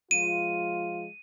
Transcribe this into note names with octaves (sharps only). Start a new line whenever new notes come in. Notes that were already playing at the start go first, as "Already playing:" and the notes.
F3 G#3 F4 D#7